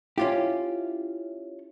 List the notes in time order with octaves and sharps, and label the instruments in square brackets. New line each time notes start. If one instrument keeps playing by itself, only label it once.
[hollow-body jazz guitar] C#4 F4 G4 [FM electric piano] E4